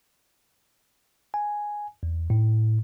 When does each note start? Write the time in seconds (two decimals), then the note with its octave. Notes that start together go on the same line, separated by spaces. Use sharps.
1.34 G#5
2.03 E2
2.30 A2